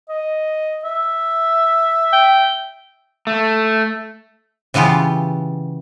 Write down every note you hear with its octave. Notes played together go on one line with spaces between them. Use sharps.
D#5
E5
G5
A3
C#3 E3 B3 F4 G4